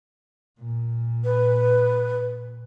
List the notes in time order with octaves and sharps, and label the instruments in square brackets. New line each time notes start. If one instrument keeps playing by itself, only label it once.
[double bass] A#2
[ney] B4